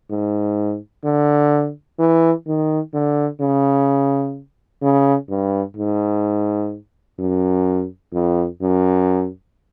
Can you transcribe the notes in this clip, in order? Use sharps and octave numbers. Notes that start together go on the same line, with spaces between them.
G#2
D3
E3
D#3
D3
C#3
C#3
G2
G#2
F#2
F2
F#2